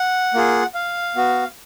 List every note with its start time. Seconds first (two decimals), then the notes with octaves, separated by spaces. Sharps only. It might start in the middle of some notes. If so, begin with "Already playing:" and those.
Already playing: F#5
0.34 A#3 F4 G#4
0.74 F5
1.16 B3 F#4